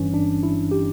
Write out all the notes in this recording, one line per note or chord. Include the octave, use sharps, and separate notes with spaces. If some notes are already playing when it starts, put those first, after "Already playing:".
Already playing: G1 G2 E3 C#4
D4
E4
G4